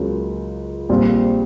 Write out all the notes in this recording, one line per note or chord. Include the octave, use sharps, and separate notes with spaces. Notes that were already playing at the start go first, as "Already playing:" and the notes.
Already playing: C#2 C#3 F#3 A#3
A#1 A#2 G3 C4 F4